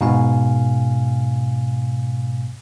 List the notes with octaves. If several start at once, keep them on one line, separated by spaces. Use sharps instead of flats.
G#2 B2 F5 G#5